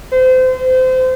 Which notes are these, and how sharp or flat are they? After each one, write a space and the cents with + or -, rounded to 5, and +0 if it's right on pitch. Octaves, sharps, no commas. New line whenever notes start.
C5 -30